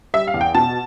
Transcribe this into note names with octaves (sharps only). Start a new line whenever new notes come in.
G3 E5
F5
E2
G5
B2 A5